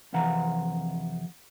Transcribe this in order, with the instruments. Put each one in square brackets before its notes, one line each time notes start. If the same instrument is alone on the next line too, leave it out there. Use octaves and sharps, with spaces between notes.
[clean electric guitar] F2 C3 E3 F5 F#5 A#5